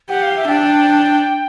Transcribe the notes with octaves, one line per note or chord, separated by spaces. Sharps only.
G4 F#5
F5
E5
D4 G5